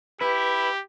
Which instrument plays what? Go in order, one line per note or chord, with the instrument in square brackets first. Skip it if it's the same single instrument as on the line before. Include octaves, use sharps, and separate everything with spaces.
[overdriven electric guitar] E4 [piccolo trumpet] G4 [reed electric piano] B4